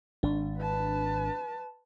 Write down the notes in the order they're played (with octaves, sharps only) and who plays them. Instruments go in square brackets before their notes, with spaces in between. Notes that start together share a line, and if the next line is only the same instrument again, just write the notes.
[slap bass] G#1 [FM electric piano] D4
[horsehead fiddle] B4 A5